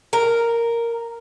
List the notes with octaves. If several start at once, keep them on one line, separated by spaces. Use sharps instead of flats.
A#4